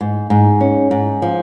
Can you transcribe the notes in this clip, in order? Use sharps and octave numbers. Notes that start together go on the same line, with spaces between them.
G#2
G#2
C#4
G#2
F3